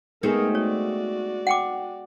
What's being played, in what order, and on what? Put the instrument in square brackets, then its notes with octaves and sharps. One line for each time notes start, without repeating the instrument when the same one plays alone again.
[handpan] G#3 B3 G#4 [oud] A3 C4 D#4 [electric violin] A#4
[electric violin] F#4 D5 [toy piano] C#5
[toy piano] F#5 G5 D6